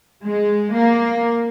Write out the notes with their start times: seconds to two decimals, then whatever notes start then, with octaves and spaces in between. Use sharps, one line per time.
0.23 G#3
0.75 A#3